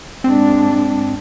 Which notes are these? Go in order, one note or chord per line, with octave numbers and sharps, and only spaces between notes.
G#2 G#3 C4 D4